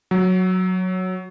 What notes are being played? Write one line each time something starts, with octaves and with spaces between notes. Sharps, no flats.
F#3